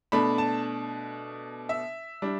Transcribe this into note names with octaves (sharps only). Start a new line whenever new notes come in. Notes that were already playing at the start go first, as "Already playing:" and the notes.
B2 A3 D4 B5
A5
E5
G3 D4